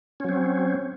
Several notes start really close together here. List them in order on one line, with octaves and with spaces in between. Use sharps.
C#4 F#3 C4